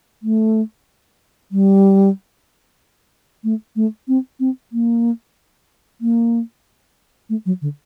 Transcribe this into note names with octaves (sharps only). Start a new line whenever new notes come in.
A3
G3
A3
A3
C4
C4
A#3
A#3
A3
F#3
D3